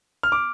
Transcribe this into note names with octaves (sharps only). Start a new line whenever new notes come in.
F6
D6